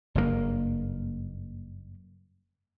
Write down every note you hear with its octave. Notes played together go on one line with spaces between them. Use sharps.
F#1 G2 A#2 A#3